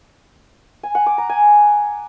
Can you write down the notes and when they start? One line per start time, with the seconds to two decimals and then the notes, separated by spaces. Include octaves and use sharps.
0.83 G#5
0.95 F#5
1.06 D6
1.18 A#5
1.29 G#5